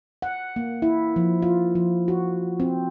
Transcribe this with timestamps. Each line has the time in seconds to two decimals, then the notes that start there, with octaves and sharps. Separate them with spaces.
0.22 F#5
0.56 A#3
0.82 E4
1.16 F3
1.42 F4
1.75 F3
2.08 F#4
2.60 C4